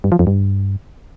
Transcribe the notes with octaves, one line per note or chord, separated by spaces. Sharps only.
G2
F3
F2
G2